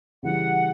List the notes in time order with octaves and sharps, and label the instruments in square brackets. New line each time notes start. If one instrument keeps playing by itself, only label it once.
[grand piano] C#3 E3 G3 [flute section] F#5